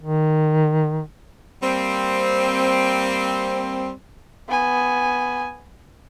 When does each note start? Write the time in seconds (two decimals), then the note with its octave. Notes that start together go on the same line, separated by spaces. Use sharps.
0.02 D#3
1.62 G3 A#3 C4
4.48 B3 G#5